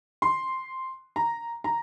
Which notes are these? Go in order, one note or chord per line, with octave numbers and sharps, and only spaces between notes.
C6
A#5
A#5